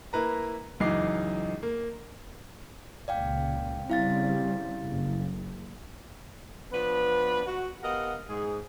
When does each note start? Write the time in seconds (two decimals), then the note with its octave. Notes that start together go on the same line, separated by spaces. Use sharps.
0.13 A#3 E4 B4 A#5
0.80 C#2 F#2 E3 D#4 D6 C7
1.63 A#3
3.08 C#2 A#2 D5 F5 G5
3.90 C#3 G3 C4 E4 F5 A6
4.85 F#1
6.72 F3 B3 D4 B4
7.46 F#4
7.82 B3 G4 A#4 D#5 F5 F#5
8.28 G#2 G#4